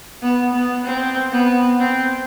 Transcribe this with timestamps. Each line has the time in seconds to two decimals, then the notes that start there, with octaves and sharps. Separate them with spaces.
0.22 B3
0.54 B3
0.85 C4
1.32 B3
1.79 C4